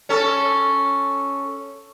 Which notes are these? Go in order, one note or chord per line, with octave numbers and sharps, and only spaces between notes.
C#4 A4